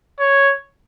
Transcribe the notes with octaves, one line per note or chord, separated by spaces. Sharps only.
C#5